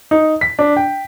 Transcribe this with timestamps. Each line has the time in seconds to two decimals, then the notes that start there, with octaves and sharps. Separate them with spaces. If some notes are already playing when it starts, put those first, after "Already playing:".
0.11 D#4
0.41 B6
0.59 D4
0.77 G5